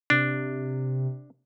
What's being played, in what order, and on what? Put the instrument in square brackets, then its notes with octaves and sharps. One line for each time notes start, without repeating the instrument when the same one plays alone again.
[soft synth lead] C3 [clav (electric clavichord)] D4